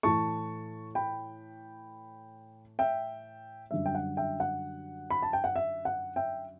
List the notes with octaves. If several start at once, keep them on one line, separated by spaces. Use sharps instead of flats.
A2 E3 A3 A5 C#6
G5 B5
E5 G5
F#2 D3 G3 E5
G5
F#5
E5 G5
F#5
B5
A5
G5
F#5
E5
F#5
E5 G5